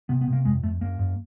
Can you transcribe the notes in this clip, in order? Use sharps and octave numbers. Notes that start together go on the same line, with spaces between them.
C3 B3
B3
C3
A#3
F2 G#3
F2 A3
F#2 A#3
F#2